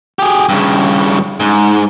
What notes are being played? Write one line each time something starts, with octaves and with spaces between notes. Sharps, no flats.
G4 G#4
G2 C#3
G#2